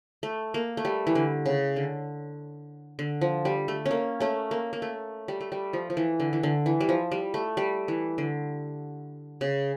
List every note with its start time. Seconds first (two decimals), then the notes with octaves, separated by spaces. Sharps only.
0.23 A3
0.54 A#3
0.77 A3
0.85 G3
1.07 E3
1.15 D3
1.46 C#3
1.76 D3
2.99 D3
3.21 F3
3.45 G3
3.68 A3
3.86 C#4
3.91 A#3
4.20 A3 C#4
4.51 A#3
4.73 A#3
4.82 A3
5.28 G3
5.41 A3
5.52 G3
5.73 F3
5.90 F3
5.97 E3
6.20 D3
6.33 E3
6.43 D3
6.66 E3
6.80 G3
6.89 F3
7.12 G3
7.34 A3
7.57 G3
7.88 E3
8.18 D3
9.41 C#3